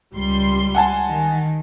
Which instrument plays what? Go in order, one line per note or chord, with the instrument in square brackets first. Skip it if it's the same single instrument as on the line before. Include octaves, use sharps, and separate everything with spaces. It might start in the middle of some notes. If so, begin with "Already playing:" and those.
[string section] C#2 G3 C6
[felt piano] F#5 G#5 A5
[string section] D#3